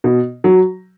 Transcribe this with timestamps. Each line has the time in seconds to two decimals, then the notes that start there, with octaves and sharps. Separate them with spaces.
0.04 B2
0.44 F#3